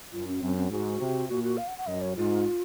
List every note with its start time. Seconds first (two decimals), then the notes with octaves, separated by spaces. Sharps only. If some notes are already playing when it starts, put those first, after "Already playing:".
0.12 F#2 F4
0.28 C#4
0.41 F#2 C4
0.57 C4
0.70 G#2 F#4
0.99 C3
1.29 A#2 F#4
1.44 F#4
1.57 F5
1.67 F#5
1.78 F#5
1.87 F#2 D#5
2.01 C#5
2.16 G#2 F4